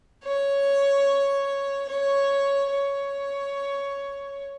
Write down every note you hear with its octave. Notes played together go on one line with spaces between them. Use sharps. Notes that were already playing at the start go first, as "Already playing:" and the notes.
C#5
C#5
C#5